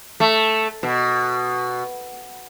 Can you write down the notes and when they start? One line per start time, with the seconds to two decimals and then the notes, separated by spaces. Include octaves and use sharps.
0.20 A3
0.83 B2